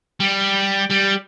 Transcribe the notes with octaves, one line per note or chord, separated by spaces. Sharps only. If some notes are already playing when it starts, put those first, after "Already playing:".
G3
G3